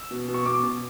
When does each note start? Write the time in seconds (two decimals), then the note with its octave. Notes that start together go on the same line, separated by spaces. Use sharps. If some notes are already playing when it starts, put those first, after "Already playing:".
Already playing: E6
0.11 B2
0.29 B2
0.34 C#6
0.46 B2 D6
0.63 B2